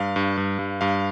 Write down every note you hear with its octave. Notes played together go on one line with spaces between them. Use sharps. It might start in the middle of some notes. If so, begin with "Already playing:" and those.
Already playing: G2 F5
G2
G2
G2
G2 F5